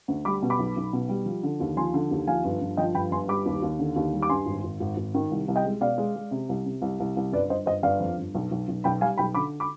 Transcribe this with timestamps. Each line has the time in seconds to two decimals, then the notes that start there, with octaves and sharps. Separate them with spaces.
0.08 D2
0.25 G3 B5 D6
0.42 B2
0.50 B5 D6
0.59 B1
0.76 B1
0.93 B2
1.09 G3
1.26 F3
1.43 D3
1.60 D#2
1.77 F3 G#5 C6
1.94 D3
2.11 D#2
2.27 F3 F5 G#5
2.44 G1
2.61 G1
2.77 F3 D#5 G5
2.94 G1 G5 B5
3.11 G1 G#5 C6
3.28 G3 B5 D6
3.46 D#2
3.63 D#2
3.79 D3
3.96 D#2
4.13 G3
4.23 D6
4.29 G2 G#5 C6
4.46 G#1
4.64 G#1
4.80 G#1
4.97 G#1
5.14 D#3
5.31 C2
5.48 C2
5.56 D#5 G5
5.65 G#3
5.81 B2 D5 F5
5.98 G#3
6.16 G#3
6.31 C3
6.49 C2
6.65 C3
6.82 C2
7.00 C2
7.16 C2
7.32 G1 B4 D5
7.49 G1 C5 D#5
7.66 G1 C5 D#5
7.83 G1 D5 F5
8.00 F2
8.17 G1
8.34 B1
8.51 B1
8.68 B1
8.84 B1 G5 B5
9.01 G3 F5 G#5
9.18 B1 G5 B5
9.35 D3 B5 D6
9.60 B5 D6